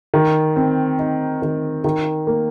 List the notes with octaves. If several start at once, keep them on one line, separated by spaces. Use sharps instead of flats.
D#3
C4
D#4
D#3
D#3
A#3